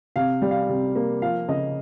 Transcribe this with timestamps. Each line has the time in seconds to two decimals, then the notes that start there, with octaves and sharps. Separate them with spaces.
0.16 C3 F5
0.42 G3
0.51 F5
0.69 C3
0.95 A#3
1.22 F3 F5
1.48 C#3 D#5